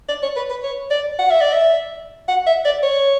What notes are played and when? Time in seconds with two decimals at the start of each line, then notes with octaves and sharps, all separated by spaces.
0.09 D5
0.23 C#5
0.36 B4
0.50 B4
0.63 C#5
0.90 D5
1.19 F#5
1.30 E5
1.41 D5
1.53 E5
2.28 F#5
2.46 E5
2.65 D5
2.83 C#5